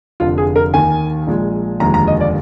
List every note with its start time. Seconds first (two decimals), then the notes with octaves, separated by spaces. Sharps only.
0.20 F1 F2 D3 F4
0.38 G#4
0.56 A#4
0.74 D#2 D#3 A#3 G#5
1.27 A#1 A#2 G#3
1.80 F1 D#2 D3 F3 G#3 A#5
1.94 A#5
2.07 D#5
2.20 D5